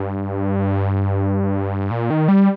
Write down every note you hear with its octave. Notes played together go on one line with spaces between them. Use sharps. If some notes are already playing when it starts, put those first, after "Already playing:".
Already playing: G2
A#2
D#3
G3